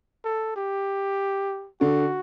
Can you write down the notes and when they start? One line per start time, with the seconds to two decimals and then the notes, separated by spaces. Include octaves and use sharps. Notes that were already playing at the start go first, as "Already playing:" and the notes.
0.25 A4
0.56 G4
1.81 D3 F#4